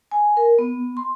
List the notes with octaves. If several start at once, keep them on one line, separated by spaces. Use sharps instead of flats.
G#5
A#4
B3
C6